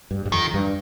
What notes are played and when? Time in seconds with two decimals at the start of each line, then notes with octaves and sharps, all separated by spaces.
0.11 G2
0.26 G2
0.32 F2 D#3
0.54 G2